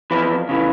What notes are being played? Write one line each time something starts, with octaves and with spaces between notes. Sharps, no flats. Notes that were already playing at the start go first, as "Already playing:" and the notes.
F2 E3 E4
C#3 E3